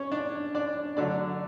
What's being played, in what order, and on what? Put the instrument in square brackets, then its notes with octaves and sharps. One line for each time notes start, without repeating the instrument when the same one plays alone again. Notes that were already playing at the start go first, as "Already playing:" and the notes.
Already playing: [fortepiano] C#4 C#5
D4 D5
D4 D5
D3 F#3 A3 D4 D5